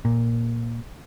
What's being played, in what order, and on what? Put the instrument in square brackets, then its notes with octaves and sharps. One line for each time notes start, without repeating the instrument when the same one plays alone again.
[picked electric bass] A#2